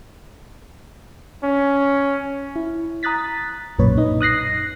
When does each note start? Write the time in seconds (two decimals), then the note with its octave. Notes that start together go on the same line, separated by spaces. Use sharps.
1.44 C#4
2.56 E4
3.03 A#5 D#6 F#6 A6 B6
3.79 B1 F#2 A#2 B4 C#5
3.98 D#4 D#5
4.21 D#6 F#6 A#6 C7